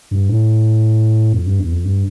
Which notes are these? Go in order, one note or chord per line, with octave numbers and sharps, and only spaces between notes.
G2
A2
F2
G2
E2
F2
G2